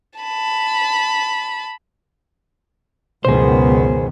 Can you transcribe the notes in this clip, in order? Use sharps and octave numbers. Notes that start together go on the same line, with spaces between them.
A5 B5
C#2 F#2 B2 D#3 B3 G#4 C5